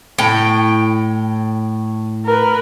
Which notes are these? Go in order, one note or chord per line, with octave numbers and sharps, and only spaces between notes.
A2 G5
A#4 B4